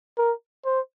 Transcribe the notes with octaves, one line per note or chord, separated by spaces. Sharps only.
A#4
C5